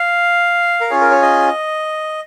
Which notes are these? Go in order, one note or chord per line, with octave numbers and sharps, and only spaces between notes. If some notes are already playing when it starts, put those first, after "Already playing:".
Already playing: F5
A#4
C#4 F4 G#4 C#5
A#4
C#5
D#5